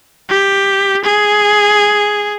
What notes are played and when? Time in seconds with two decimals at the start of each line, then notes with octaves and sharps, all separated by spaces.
0.30 G4
1.04 G#4